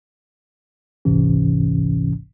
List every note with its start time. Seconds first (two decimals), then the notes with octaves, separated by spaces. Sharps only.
1.05 G1 C2 G#2 C3 E3 C#4